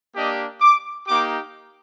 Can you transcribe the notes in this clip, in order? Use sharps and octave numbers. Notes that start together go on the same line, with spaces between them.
A#3 D4 G4 D#5
D6
A#3 D#4 G4 D6